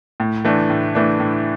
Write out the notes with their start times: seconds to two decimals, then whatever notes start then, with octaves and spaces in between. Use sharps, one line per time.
0.20 A2
0.45 E3 A3 D4
0.70 A2
0.95 E3 A3 D4
1.20 A2